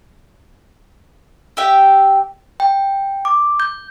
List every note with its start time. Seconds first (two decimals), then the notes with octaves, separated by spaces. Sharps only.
1.57 G4 E5 G5
2.60 G5
3.25 D6
3.60 G6